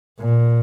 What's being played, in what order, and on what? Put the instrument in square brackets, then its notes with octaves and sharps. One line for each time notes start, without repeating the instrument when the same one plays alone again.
[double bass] A#2